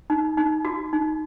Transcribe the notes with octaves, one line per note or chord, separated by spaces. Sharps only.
D#4
D#4
F#4
D#4